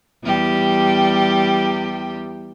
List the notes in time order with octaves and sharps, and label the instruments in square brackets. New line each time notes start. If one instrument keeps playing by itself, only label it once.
[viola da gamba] E2 G3 G4